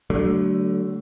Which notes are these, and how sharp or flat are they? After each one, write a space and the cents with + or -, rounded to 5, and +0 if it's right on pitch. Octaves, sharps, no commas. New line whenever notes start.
D3 +0 F#3 +40 A3 +0